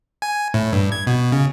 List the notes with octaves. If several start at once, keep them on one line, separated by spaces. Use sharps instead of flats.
G#5
A2
G2
G#6
B2
C#3